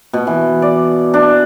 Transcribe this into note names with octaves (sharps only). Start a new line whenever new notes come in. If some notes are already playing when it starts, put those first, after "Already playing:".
B2
E3
D5
D4